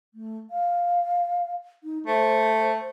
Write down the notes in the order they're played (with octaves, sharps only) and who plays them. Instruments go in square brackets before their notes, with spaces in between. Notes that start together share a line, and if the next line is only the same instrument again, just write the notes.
[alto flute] A3
F5
D#4
[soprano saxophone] A3 [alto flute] C5